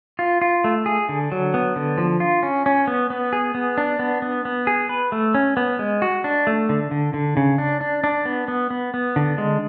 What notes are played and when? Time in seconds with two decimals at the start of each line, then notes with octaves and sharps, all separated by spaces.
0.19 F4
0.42 F4
0.64 A3
0.86 G#4
1.09 D3
1.32 F#3
1.54 B3
1.76 D3
1.98 F3
2.20 F4
2.43 C#4
2.66 C#4
2.88 B3
3.10 B3
3.33 G#4
3.55 B3
3.78 D4
3.99 B3
4.22 B3
4.45 B3
4.67 G#4
4.89 B4
5.12 A3
5.35 C#4
5.57 B3
5.79 G#3
6.02 F#4
6.24 D4
6.47 A3
6.69 D3
6.91 D3
7.14 D3
7.37 C#3
7.58 D4
7.81 D4
8.04 D4
8.25 B3
8.48 B3
8.71 B3
8.94 B3
9.16 D3
9.38 G#3